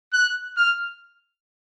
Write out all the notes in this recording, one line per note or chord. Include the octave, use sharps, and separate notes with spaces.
F#6
F6